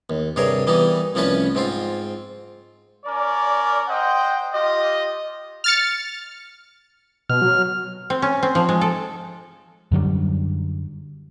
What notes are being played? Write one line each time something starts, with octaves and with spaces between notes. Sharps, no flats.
D#2
G2 C3 G#4 A#4 C#5
E3 G3 B3 D#4
C2 F3 A3 C#4 B4 C#6
G#2 C4 F4
C#4 A#4 D5
C5 D#5 F#5 G5
F4 G4 D#5
F6 A6 C#7
B2 F6
F#3
C4
C#4
C4
F3
G#3
A4
F#2 D3 F#3 G3